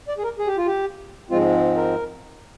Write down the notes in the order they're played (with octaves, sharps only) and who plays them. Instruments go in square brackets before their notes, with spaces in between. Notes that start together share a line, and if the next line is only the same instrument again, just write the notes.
[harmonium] D5
G#4
A#4
G#4
G4
F4
G4
G#2 F3 G#3 C4 F4
A#4